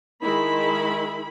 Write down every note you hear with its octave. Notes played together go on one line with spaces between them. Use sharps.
D#3 G#3 E4 B5